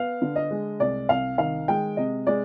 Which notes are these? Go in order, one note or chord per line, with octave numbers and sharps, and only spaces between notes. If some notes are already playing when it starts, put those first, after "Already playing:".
Already playing: B3 F5
D3
D#5
G#3
C2 D5
C2 F5
D#3 F5
G#3 G5
C3 D#5
G#3 D5